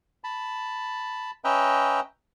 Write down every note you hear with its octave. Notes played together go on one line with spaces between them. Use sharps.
A5 B5
C#4 B4 D#5 E5 G5 A#5